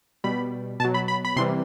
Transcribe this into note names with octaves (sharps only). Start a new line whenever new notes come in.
B2 G3 B5
B2 F#3 A5
B5
B5
B5
C3 E3 G3 C6